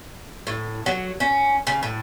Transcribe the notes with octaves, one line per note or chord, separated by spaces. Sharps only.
A2
F#3
C#4
C#3
A2